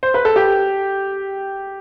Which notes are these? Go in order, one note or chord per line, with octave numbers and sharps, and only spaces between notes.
C5
B4
A4
G4